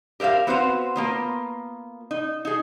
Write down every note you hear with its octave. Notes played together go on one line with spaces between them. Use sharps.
G4 A#4 C5 E5 F5
B3 C4 F#4 B4 C5 F5
A#3 B3 F4
D#4
D#4 G#4